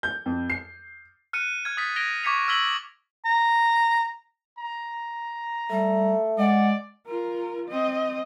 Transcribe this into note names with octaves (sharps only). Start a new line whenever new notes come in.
G6
F2
C7
F6 F#6 C#7 D#7
F6 G#6
D#6 A6 B6
G#6 A#6 D7 F7 G7
C#6 D6 G#6 B6 C#7 F7
E6 F6 G#6 B6 F#7 G7
A#5
A#5
G3 A3
G#3 D5 F#5
F4 A#4
C4 D#5